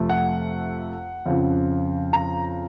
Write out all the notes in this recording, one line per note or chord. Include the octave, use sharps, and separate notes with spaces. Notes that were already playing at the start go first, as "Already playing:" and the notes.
Already playing: F2 C3 F3 A3
F#5
F2 C#3 F3
A#5